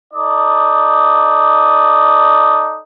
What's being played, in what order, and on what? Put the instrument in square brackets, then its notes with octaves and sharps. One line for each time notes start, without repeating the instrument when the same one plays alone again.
[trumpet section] D#4 A4 D5 D#6